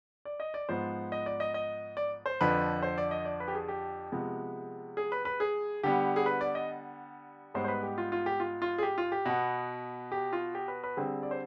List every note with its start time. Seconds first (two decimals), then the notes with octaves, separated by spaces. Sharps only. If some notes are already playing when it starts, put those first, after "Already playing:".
0.25 D5
0.40 D#5
0.54 D5
0.69 G#2 F3 B3 C5
1.12 D#5
1.26 D5
1.40 D#5
1.54 D#5
1.97 D5
2.26 C5
2.41 F2 D3 F3 B4
2.82 C5
2.98 D5
3.11 D#5
3.25 D5
3.40 B4
3.48 G4
3.54 G#4
3.68 G4
4.12 C3 F3 G#3 B3
4.97 G#4
5.12 B4
5.25 B4
5.40 G#4
5.83 D3 G3 B3 G4
6.16 G#4
6.26 B4
6.41 D5
6.55 D#5
7.54 G#2 G3 B3 C5
7.64 C5
7.68 B4
7.83 G4
7.98 F4
8.12 F4
8.26 G4
8.40 F4
8.62 F4
8.78 G#4
8.82 G4
8.98 F4
9.12 G4
9.26 B2 B3
10.12 G4
10.33 F4
10.55 G4
10.68 B4
10.84 B4
10.97 D3 G3 C4 G#4
11.23 D5
11.31 C5